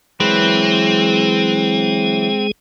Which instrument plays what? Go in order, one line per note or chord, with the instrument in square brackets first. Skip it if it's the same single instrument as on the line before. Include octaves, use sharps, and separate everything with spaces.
[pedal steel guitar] E3 F#3 B4 [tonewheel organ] G#3 G#4 [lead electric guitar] C4